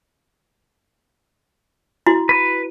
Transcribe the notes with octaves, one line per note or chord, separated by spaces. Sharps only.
E4 F#4
B4